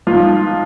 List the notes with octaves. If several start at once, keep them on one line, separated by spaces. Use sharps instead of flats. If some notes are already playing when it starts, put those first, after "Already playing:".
G#2 F3 F4